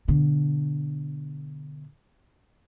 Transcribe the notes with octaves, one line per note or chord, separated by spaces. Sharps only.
B2 D3